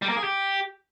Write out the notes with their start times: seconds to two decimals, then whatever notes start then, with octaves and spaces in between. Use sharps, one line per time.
0.02 G3
0.09 A#3
0.17 G#4
0.24 G4